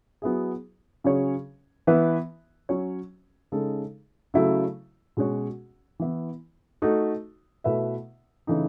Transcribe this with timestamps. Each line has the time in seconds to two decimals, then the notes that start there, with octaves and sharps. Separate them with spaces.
0.22 F#3 B3 E4 G#4
1.04 C#3 F#3 C#4 G#4 C#5
1.87 E3 B3 E4 B4 E5
2.69 F#3 C#4 F#4 C#5
3.52 C#3 G#3 D#4 A4
4.34 C#3 F#3 A3 E4
5.17 B2 G#3 C#4 F#4 C#5
5.99 E3 B3 E4
6.82 A3 D#4 F#4
7.64 B2 A3 E4 B4 E5
8.47 C#3 E3 A3 D#4